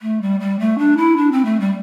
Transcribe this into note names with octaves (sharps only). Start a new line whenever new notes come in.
A3
G3
G3
A3
D4
E4
D4
C4
A3
G3